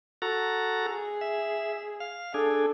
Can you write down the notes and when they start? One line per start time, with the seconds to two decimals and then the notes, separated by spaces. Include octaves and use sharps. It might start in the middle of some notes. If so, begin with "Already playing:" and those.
0.22 F#4 A4 A#5
0.84 G#4
1.21 E5
2.00 F5
2.34 D4 G#4 A4